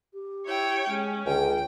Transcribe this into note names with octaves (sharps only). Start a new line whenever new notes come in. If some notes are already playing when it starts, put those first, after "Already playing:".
G4
E4 C#5 G5
G#3 C#4
C#2 D3 G5